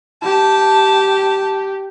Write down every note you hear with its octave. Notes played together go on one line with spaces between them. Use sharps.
G4 A5